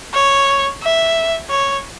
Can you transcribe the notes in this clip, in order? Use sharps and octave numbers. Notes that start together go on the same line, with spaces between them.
C#5
E5
C#5